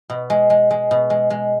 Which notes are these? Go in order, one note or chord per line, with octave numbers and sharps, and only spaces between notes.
B2
G#3
G#3
G#3
B2
G#3
G#3